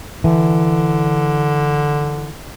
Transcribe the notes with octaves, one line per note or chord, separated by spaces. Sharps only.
D3 E3